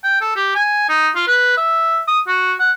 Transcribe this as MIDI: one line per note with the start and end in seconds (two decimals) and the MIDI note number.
0.04 0.20 79
0.21 0.34 69
0.36 0.51 67
0.55 0.88 80
0.89 1.10 63
1.15 1.27 65
1.27 1.53 71
1.57 2.02 76
2.08 2.20 87
2.27 2.54 66
2.59 2.72 78